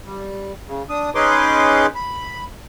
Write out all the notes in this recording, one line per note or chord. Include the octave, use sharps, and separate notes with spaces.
G3
C#3
D4 D#6
C#4 D#4 G#4 B4 C6 D6
B5